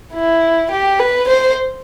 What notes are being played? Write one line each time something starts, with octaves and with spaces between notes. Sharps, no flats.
E4
G4
B4
C5